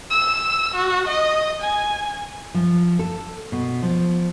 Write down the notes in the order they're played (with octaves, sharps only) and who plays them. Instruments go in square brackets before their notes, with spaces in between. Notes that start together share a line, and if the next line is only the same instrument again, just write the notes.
[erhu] E6
F#4
D#5
G#5
[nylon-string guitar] F3
A4
B2
F3